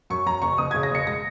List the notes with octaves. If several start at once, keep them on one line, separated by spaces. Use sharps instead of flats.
F#2 C#6
F#2 A#5
F#1 C#6
F#1 D#6
C#3 G#6
A#6
F#1 C#7
G#3 A#6